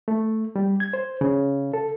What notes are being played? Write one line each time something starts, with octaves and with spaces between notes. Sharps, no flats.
A3
G3
G#6
C5
C#3
A4